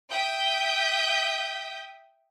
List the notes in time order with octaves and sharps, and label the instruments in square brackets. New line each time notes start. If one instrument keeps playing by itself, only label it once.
[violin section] E5 G5 D#6 G6 B6